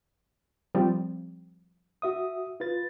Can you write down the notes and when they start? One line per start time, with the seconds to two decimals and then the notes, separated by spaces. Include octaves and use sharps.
0.75 F3 G3 C4
2.02 F#4 E5 D#6
2.60 F4 B4 A6